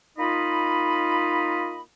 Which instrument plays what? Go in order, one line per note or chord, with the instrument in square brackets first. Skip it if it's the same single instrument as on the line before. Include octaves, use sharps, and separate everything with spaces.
[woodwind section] A#3 D#4 F4 D#5 B5